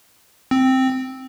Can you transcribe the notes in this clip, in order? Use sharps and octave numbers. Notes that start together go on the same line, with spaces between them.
C4